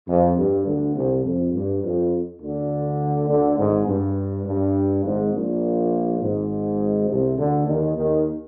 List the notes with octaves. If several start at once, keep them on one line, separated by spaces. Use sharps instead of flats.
F2
G2
D2 D3
C2 C3
F2
G2
F2
D2 D3
D2 D3
G#1 G#2
G2
G2
G#1 G#2
A#1 A#2
G#1 G#2
C2 C3
D2 D3
D#2 D#3
D#2 D#3